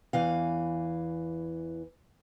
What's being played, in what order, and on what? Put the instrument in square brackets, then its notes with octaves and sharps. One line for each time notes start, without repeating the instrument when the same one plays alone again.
[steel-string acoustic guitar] E2 E3 F5